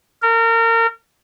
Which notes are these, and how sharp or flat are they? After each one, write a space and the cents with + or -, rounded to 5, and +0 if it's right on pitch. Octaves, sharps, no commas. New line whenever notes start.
A#4 -30